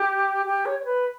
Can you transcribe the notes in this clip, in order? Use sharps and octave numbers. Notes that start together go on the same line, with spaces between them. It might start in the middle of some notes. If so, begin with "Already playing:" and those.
Already playing: G4
G4
C#5
C#5
B4